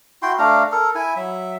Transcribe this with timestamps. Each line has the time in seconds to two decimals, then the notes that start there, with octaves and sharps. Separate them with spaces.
0.22 E4 F#4 G5 C6
0.39 A3 D4 F5 A#5
0.72 A4 A#4
0.95 E4 G#5
1.16 F#3 E5